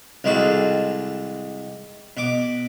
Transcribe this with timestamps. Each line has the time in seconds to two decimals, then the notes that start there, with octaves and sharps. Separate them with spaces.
0.24 C2 D#3 G#3 F#4 A4
2.17 B2 D6